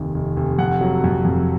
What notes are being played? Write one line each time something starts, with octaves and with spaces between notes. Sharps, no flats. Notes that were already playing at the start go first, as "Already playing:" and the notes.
Already playing: F1 D#2
F1
F1
F2 F#5
F#3
F2
F2